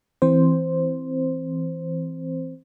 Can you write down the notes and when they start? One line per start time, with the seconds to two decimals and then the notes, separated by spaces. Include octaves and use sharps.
0.22 E3 C4 C5